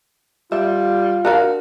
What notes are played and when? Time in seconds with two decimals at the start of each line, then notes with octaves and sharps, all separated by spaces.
0.52 G3 F4 E5
1.25 D4 F#4 A#4 F5